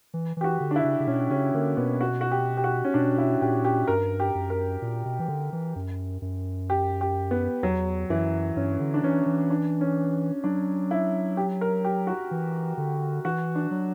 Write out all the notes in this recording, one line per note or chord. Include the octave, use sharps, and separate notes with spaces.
E3
E3 G4
F#4
D3
D4
E4
C#3
C#3
B2 C#4
C#3 C#4
D3 A#3
B2 B3
F#4
F#4
G4
G4
F#4
C#4
B2 D4
E4
A#2 G4
G4
G2 A#4
G4
F#2
A#4
A#2
B2
E3
D3
E3
F#2
F#2
G4
G4
B3
E2 F#3
F#2 E3
G2 C#4
D3
D4
E3 C#4
E3
D4
C#4
F#3 D4
E4
G4
A#4
G4
F#4
E3
D3
E3 F#4
D4
F#3